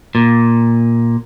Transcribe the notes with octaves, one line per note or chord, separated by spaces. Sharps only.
A#2